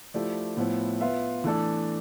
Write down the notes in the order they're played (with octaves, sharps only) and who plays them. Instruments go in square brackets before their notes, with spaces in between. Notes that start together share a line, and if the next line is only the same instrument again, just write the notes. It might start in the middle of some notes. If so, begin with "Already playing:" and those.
[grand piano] F3 A3 E4 G4 D5
A2 F3 B3 E4
B3 F4 B4 E5
E3 A3 D4 A4